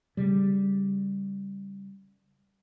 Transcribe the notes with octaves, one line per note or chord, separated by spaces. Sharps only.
C#3 G3